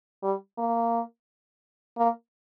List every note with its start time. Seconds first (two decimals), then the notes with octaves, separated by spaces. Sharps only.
0.23 G3
0.58 A#3
1.98 A#3